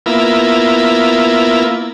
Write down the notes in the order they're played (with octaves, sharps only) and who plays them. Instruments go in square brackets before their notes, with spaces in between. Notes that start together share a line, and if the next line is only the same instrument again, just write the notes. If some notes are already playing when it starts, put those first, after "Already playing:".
[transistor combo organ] A#3 B3 E4 F4